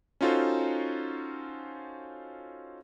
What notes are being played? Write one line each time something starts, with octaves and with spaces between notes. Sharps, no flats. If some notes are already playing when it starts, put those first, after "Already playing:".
C#4 D#4 F4 F#4 A4 C5